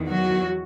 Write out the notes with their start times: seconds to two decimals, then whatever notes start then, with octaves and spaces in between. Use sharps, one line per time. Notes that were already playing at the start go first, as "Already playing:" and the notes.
Already playing: E2 D#3
0.09 F#3 F#4